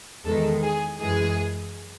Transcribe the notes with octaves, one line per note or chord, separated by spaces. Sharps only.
E2 D#3 G#3 A4
G#4
F#2 E3 G#3 G#4